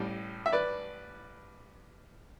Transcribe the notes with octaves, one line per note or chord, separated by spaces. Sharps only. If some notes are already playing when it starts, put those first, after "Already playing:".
Already playing: A1 A2 G3
E5
B4 D5